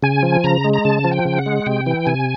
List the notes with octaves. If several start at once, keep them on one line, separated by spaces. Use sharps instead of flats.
C#3 G#5
F3
C#3 A#5
G#3
A#5
C#3 A5
F3
G5
C#3
F#5
G#3
C3 G5
E3
C3 G#5